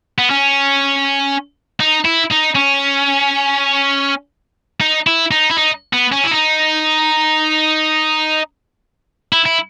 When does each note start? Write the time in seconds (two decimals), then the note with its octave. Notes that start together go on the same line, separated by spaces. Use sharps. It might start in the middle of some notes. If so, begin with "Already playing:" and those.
0.19 B3
0.30 C#4
1.80 D#4
2.05 E4
2.31 D#4
2.55 C#4
4.81 D#4
5.07 E4
5.31 D#4
5.50 E4
5.57 D#4
5.93 B3
6.13 C#4
6.24 E4
6.31 D#4
9.33 E4
9.46 E4